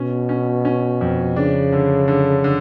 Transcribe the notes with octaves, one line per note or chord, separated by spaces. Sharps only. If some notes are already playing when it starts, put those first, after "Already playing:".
Already playing: B2 C#4
C#4
C#4
F2
C#3 D4
D3
D3
D3